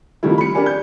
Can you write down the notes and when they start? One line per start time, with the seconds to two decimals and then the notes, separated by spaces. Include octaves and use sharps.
0.23 F2 A#2 D#3 G3 A3 E4
0.38 B5 C#7
0.55 D4 G4 A#4 D5 G#5
0.66 G6